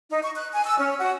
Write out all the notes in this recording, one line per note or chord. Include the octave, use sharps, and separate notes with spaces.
D#4
C#6
F#6
G#5
E6
C#4
F#4